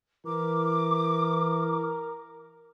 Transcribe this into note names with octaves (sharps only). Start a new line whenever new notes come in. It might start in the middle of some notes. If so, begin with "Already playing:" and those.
E3 A#4 D6